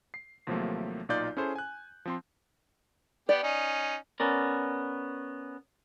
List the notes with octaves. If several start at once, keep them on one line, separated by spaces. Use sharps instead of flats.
C7
D#2 C3 F3 F#3 A3 A#3
B1 A#2 D#4 F4 D5 G6
C#4 E4 G#4 A4 C5
G#5 F#6
F3 C4 C6
B3 G4 D5
C#4 D#4
B3 C#4 A#4 D5